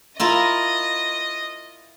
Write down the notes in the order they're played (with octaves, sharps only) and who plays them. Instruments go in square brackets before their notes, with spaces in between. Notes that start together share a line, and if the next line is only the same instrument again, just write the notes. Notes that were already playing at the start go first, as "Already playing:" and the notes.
[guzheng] E4 F4 A#4 [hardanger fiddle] D#5